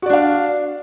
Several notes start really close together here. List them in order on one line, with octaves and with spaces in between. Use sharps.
F#4 D5 D4 F5